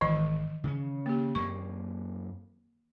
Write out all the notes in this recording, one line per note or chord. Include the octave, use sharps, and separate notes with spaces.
G#1 D#3 E3 D#5
C#3 C4 C#4
A#3 G4
F#2 A#3 C4 C#6